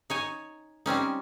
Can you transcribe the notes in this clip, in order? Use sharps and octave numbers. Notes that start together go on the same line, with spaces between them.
D#4 C#5 G#5
G3 C4 C#4 D#4